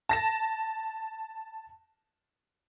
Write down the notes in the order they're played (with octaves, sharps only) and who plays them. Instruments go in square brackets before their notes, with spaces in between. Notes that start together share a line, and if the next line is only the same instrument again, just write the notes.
[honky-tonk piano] A5 A#6 E7